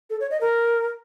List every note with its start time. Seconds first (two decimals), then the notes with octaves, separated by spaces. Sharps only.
0.10 A4
0.20 C#5
0.31 D#5
0.41 A#4